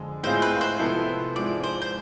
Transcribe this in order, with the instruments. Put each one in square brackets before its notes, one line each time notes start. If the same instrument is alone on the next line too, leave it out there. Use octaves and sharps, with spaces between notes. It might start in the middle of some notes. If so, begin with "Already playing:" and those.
Already playing: [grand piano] F2 D3 G#3
[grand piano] A2 G#3 C4 F4 G#4 [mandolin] C5
[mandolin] B4
C5
[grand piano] C3 F3 B3 E4 A4
[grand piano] G#2 F3 G#3 C4 E4 [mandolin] D5
[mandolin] C5
C5